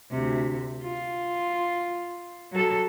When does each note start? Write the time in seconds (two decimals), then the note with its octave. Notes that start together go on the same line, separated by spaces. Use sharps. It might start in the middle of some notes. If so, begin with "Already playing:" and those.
0.10 D2 C3
0.83 F4
2.52 F#3 A4